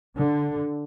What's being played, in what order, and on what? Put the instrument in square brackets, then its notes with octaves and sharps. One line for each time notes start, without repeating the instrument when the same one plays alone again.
[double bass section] D3